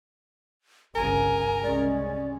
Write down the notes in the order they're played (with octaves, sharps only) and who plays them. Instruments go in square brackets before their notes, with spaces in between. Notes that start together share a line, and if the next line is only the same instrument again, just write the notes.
[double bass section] G1 C2 C#3 [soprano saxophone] A#4 [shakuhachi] G#5
[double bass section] C2 G#3 C#4 [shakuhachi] D5